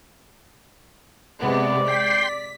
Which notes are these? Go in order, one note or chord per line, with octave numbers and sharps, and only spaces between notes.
C3 G#3 B3 D5
G5 C6 B6